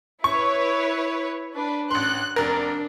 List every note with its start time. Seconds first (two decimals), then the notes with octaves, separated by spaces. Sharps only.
0.24 E4 B4 C#5 C#6
1.54 D4 B4
1.91 A1 C6 F#6
2.36 F1 D4 A#4